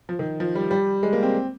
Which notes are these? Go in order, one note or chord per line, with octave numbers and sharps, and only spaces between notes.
F3
D#3
F3
G3
G3
G#3
A#3
C4